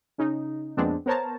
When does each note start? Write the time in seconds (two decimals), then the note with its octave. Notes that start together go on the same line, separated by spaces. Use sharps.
0.18 C#3 D#4
0.77 F2 A#2 G#3 B3 C4 D4
1.06 B3 A#4 C5 C#5 A5 A#5